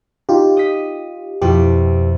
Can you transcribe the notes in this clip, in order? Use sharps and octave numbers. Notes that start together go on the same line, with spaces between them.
D#4 F4 G4
D#5 B6
F2 B2 E4 G4